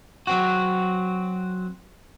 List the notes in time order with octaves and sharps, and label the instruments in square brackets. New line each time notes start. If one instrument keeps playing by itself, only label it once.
[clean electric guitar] F#3 C4 F#4